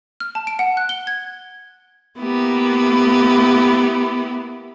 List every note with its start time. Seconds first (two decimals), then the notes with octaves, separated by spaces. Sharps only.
0.20 F6
0.35 A5
0.47 D7
0.59 F#5
0.77 F#6
0.89 G7
1.07 G#6
2.19 A#3 B3 E4 G4